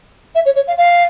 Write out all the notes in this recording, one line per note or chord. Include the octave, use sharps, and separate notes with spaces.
E5
C#5
C#5
F5
F5